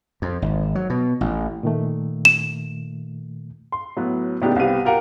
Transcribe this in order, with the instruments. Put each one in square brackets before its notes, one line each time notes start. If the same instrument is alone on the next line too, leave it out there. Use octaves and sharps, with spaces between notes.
[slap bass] F2
G#1
F#3
B2
A1
[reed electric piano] A#2 D#3 A3
[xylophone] E7
[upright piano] C6
A2 F#3 B3
A2 C#3 B3 D4 D#4 G4
C2 B3 C4 G4 F5 D#7
F4 G4 A#4 F5 F#5